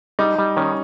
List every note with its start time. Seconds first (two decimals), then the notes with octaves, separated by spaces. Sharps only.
0.19 G3 D#4
0.38 G3
0.57 D#3 C#4